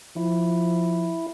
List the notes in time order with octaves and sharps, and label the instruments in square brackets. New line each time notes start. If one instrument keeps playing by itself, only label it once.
[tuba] F3 [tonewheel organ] E4